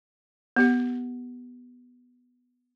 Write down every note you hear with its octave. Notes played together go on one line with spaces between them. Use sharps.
B3 G4 F#5